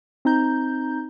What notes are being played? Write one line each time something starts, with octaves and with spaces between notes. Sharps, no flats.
C4 D#4 A#5 G6